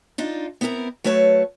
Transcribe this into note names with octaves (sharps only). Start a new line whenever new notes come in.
D4 D#4 F4
B3 C4 E4 A4 A#4
F#3 A3 B4 C#5 A5